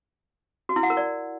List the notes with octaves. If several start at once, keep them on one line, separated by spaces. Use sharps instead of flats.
F#4
E4
F#5
A#4
D5